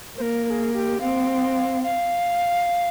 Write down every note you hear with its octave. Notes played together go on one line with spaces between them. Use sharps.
A#3 A#4 C5
A#4
G#4
G4
C4 F5
F5